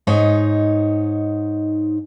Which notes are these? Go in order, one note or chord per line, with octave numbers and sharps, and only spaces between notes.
G#2 D#4 C#5